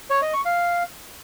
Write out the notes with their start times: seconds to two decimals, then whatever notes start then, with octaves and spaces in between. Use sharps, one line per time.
0.10 C#5
0.22 D#5
0.34 C#6
0.45 F5